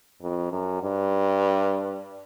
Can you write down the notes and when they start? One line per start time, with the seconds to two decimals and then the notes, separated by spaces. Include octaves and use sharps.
0.21 F2
0.52 F#2
0.82 G2